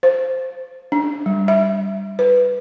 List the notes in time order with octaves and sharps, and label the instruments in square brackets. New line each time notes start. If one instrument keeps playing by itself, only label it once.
[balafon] C5
D4
G3
E5
B4